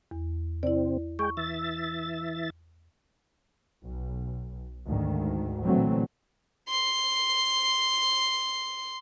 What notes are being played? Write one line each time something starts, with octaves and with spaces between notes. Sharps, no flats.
E2
C3 C4 E4 D5
G#3 G#4 G5 C#6
E3 E5 A6
B1
D2 G#2 D#3
A#2 D3 E3 F#3 A3 C4
C6 C7